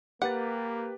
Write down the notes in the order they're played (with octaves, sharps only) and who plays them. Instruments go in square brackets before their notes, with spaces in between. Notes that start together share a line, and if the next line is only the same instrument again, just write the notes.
[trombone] A#3 [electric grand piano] G4 B4 A6 [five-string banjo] F#5